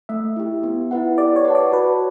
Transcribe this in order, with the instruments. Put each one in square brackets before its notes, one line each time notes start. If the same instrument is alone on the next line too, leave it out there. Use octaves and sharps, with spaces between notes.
[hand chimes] A3 [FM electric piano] E5
[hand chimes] E4 G4
B3
E4 B4 F#5
[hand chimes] G4 [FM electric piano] D5
[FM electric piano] C#5
[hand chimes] B4 F#5 A5
[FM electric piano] D5
[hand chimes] F#4 [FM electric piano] B4